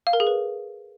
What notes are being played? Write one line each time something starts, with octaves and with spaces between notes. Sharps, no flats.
F5
A#4
G#4
B4